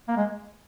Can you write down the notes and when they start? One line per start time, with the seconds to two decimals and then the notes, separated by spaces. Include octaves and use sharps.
0.08 A#3
0.17 G#3